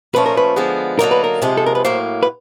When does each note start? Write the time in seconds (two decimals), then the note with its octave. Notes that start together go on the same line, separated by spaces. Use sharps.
0.14 A#2 F3 A3 C#4 B4
0.26 A#4
0.37 B4
0.56 D3 F3 G#3 B3
0.99 D3 F#3 A#3 D#4 A#4
1.11 B4
1.24 A#4
1.42 C3 F3 G#3
1.57 A4
1.66 A#4
1.75 B4
1.85 A2 F#3 A#3 C5
2.23 B4